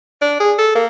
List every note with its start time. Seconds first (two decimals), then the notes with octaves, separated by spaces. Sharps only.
0.22 D4
0.40 G#4
0.58 A4
0.75 A#3